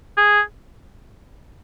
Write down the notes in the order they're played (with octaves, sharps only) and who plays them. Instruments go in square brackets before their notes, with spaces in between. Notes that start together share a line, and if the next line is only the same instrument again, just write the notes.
[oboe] G#4